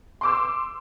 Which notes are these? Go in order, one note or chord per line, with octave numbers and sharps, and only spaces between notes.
C6 D6 E6